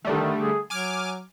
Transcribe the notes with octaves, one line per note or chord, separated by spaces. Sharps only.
D3 D#3 G3 A3
G#4
F#3 G#5 D6 F6